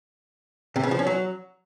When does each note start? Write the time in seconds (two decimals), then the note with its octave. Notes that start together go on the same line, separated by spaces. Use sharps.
0.76 C3
0.83 C#3
0.91 F3
0.99 C#4
1.07 F#3